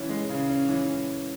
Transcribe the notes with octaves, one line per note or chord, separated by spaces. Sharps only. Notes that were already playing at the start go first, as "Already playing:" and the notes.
Already playing: C#3 E3 C#4
G#3
C#3
C#4
E3